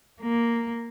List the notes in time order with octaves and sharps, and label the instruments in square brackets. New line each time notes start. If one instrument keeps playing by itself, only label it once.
[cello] A#3